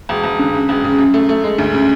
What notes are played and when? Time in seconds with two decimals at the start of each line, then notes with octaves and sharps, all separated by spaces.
0.09 E1
0.24 E1
0.39 D3
0.54 C#3
0.69 E1
0.84 C#3
0.98 F#2
1.14 A3
1.29 A3
1.44 G#3
1.59 D2
1.73 C#3